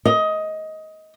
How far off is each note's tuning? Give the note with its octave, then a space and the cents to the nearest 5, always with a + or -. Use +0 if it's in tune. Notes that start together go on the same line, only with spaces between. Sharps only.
D#5 +15